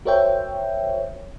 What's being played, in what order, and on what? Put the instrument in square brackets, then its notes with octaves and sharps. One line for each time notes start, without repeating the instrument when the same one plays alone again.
[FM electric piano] F#4 A#4 C5 C#5 E5 G5